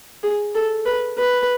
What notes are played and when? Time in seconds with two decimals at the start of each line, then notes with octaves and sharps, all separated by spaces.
0.23 G#4
0.55 A4
0.86 B4
1.18 B4